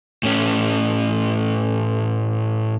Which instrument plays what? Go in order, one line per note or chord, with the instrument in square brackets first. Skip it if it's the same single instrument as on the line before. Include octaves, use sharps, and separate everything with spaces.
[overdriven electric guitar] A2 C#4